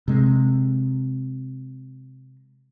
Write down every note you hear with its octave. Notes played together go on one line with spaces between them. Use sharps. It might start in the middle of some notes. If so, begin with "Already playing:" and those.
C3 G#3